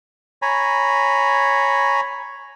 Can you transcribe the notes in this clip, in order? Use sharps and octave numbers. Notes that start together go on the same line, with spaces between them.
C#5 G#5 A#5 B5